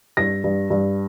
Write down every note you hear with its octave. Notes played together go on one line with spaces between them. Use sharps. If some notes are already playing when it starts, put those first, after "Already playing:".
G2 A#6
G2
G2